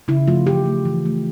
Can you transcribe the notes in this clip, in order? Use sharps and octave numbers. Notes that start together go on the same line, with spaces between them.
C#3 E4
F3 A3 F4
E3 G4
A3
E3
A3